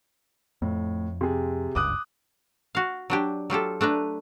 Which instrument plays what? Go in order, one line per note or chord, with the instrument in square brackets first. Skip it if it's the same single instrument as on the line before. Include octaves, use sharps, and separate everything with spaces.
[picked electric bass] F2 [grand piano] A2
[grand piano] C3 G#4
[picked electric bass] F#1 C#2 G2 [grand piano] D6 D#6 F#6
[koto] F#4 F5
F#3 D4 G4
F#3 F4 G4 A4
A3 D4 B4 A#5